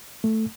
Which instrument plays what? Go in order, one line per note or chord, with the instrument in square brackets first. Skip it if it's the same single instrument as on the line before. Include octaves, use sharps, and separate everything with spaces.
[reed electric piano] A3